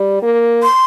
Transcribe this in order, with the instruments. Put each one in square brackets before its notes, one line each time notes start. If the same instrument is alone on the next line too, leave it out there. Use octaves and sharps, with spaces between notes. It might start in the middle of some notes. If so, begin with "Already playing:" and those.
Already playing: [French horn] G3
A#3
[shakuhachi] C6